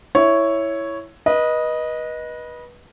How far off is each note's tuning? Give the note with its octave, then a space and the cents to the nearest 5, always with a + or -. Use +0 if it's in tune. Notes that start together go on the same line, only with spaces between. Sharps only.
E4 +0 C#5 +0
B4 -25 D#5 +0